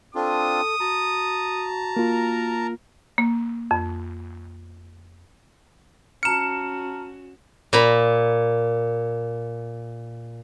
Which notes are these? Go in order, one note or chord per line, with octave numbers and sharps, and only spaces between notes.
C4 D4 F4 A4 D#6
F#4 A5 A#5
A#3 F4 A#4
A#3
F2
C#4 F#4 A5 A#5 F6 C#7 E7
A#2 A#5 B5